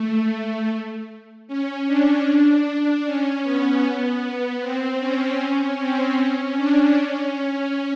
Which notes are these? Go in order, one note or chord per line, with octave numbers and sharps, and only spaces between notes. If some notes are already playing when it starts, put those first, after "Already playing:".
Already playing: A3
A3
C#4
D4
C#4
B3
B3
C4
C#4
C4
C#4
D4
C#4